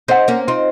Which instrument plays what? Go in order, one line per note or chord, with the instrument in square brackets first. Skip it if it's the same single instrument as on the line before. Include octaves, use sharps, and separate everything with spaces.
[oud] C4 D#4 [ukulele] C5 F#5
[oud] A#3 C#4
[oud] C4 D#4 [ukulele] F4